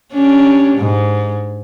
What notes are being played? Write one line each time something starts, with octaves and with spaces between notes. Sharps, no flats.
C#4 D4 G4
G#2